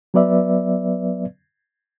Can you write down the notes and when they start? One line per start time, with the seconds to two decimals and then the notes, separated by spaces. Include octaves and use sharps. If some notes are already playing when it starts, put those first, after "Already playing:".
0.14 F#3 B3 B4 D5 E5